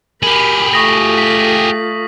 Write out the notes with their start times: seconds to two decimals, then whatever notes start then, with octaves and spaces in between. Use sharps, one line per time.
0.23 G4 G#4 A#4 B5 F#7
0.73 A3 F4 C#6 D#6 A#6
1.18 B6